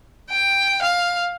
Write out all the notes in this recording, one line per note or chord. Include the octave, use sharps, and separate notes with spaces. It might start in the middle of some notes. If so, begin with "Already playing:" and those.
G5
F5